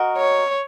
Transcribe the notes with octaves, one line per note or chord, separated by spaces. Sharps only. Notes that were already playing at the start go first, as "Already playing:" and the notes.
Already playing: F#4 A#4 D#5
C#5